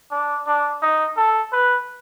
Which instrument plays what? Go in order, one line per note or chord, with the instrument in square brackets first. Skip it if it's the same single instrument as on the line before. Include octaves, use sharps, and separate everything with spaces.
[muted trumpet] D4
D4
D#4
A4
B4